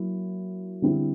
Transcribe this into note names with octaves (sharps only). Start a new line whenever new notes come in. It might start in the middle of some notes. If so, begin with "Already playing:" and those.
Already playing: F#3 A#3 E4
D3 G3 C4 E4